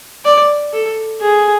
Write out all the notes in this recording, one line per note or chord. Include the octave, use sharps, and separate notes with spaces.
D5
A4
G#4